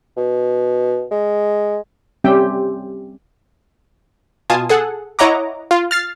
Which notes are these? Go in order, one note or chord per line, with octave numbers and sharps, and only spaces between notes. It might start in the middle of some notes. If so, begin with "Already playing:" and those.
B2
G#3
G3 C4 C#4 G4 E5 G5
B2 F4 G#5 A5 D#6
G#4 A4 F#5
E4 C#5 D#5 F#5 A#5 D6
F4
F6 A6 C7